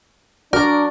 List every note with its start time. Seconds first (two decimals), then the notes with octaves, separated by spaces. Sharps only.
0.53 D4 F#4 A#4 D5